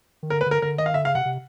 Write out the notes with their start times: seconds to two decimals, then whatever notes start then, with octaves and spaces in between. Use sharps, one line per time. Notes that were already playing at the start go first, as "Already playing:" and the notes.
0.23 D#3
0.30 D3 A#4
0.41 B4
0.46 D3
0.51 A#4
0.62 D3 A#4
0.78 D#3 D#5
0.86 F5
0.94 D3 E5
1.04 C#3 F5
1.15 C3 F#5
1.25 C3